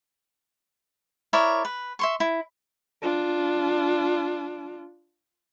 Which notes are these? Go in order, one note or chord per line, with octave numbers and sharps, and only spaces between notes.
E4 A#4 C#5 D5
B4
E5 C6 C#6
E4
D4 F4